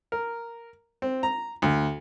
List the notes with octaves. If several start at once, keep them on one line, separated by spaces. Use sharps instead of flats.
A#4
C4
A#5
D2